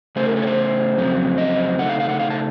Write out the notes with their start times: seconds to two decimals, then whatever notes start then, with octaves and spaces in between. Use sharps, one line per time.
0.16 C#3 A3 C#4 C5
0.26 A#4
0.36 A4
0.43 C#5
0.47 C5
0.97 F2 C#3 F#3 C4
1.38 D#5
1.79 C#3 A3 D#4 F#5
1.89 F5
2.00 F5
2.09 F#5
2.20 F5
2.30 A5